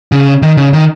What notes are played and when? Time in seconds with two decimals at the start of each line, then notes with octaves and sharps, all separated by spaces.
0.12 C#3
0.42 D#3
0.57 C#3
0.73 D#3